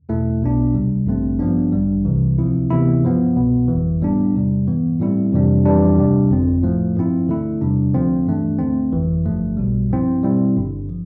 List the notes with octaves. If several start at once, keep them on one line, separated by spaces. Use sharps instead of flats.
E2 B2 A3 E4
B1 B2 B3 D4
D2 C3 G3
A1 G2 D3 A3 C4
G2 F3 B3 D4
A1 G2 D3 G3
C2 C3 E3
D2 C3 F3 C4 E4
D2 C3 E3 B3 E4
G2 F3 B3
C2 B2 B3
G1 F2 E3
A2 G3 B3 D4
E2 C3 G3
G2 E3 B3
A2 G3 C4 E4
F2 C3 E3 G3 D4
F2 E3 G3 D4
D2 C3 G3 D4
G1 F2 D3 F3 C4
A2 F3 A3
G2 F3 C4 E4
D2 D3 A3 E4
E2 C3 G3 D4
D2 D3 F3 C4
G2 E3 A3 D4
D2 D3 A3 C4
G1 F2 E3
G1 G2 D3 F3 A3
B1 B2 G3
G2 F3 C4 E4
B2 G3 C4 E4
G1 G2 D3
F3